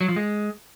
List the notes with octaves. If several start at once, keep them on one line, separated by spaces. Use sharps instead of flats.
F#3
F3
G#3